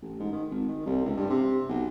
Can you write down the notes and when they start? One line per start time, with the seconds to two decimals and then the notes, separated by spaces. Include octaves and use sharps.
0.02 A1
0.19 G#2
0.32 D#3
0.51 G#1
0.68 D#3
0.85 C2
1.05 C#2
1.16 G2
1.30 C3
1.69 B1